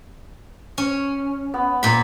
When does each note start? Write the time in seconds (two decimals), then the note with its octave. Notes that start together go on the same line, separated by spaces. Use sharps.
0.78 C#4
1.54 B3
1.83 A#2 B5